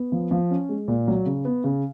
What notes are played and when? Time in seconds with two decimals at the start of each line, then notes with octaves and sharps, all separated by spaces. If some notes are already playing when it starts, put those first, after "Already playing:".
Already playing: B3
0.12 F3
0.31 F3
0.51 C#4
0.69 G#3
0.88 A#2
1.08 F#3
1.26 C#3
1.45 B3
1.64 C#3